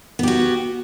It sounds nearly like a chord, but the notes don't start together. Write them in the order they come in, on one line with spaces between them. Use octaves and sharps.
B3 G4 F#4